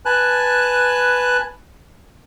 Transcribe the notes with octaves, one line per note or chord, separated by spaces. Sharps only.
B4 G#5 A5 F#6